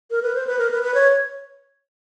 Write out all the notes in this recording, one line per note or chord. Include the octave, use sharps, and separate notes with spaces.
A#4
B4
C5
B4
A#4
B4
B4
C#5